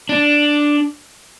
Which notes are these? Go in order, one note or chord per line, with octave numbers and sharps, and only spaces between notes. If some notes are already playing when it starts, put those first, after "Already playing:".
D4